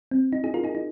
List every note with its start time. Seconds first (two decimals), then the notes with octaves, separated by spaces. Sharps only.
0.11 C4
0.33 D#4
0.44 D#4 G#4
0.54 F4 A#4
0.64 D#4 G#4
0.75 D#4